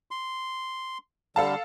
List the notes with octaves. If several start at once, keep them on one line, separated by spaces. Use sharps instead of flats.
C6
D3 G3 A4 F5 A5